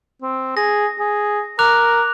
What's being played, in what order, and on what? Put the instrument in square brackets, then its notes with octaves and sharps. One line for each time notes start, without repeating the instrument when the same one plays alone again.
[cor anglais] C4
[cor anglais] G#4 [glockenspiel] A#6
[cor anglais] G#4
[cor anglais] A#4 [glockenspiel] D6 F#6 F7